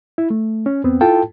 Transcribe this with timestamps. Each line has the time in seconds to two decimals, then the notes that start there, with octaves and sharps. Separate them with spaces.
0.18 E4
0.30 A3
0.66 C#4
0.84 E2 B3 C4
1.01 E4 F4 A4 G5 A5